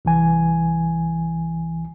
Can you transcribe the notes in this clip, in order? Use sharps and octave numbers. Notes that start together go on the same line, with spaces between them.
C2 E3 G#5